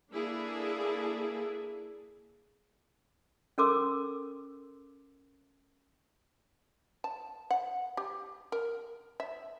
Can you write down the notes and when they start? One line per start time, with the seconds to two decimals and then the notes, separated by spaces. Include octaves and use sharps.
0.11 A#3 D4 E4 G#4 A4
3.58 C#4 A4 A#4 C6 D6 E6
7.04 A5
7.51 F#5
7.97 G4
8.52 A#4
9.20 E5